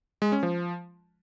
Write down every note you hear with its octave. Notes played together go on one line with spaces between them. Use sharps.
G#3
C#4
F3